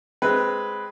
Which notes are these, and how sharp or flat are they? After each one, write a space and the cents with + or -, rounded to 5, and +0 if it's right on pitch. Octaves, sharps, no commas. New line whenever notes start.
G#3 +0 C4 +0 B4 +0